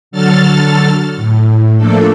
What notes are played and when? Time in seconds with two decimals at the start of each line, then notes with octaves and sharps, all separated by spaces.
0.11 D3 F#3 A4 F6 A6
1.16 A2
1.77 F3 A3 A#3 D4 A4